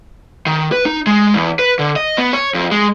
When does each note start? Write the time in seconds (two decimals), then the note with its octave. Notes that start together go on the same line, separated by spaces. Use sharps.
0.46 D#3
0.72 B4
0.86 D#4
1.06 G#3
1.34 E2
1.59 B4
1.79 D3
1.96 D#5
2.18 B3
2.33 C#5
2.54 F2
2.71 G#3